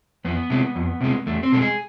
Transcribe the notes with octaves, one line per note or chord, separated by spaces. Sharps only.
F2 B3
C3 G#3
F2
C3 G#3
E2 A3
C4
B2 G#3 A4
G#4